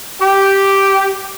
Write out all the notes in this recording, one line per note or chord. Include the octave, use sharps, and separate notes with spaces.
G4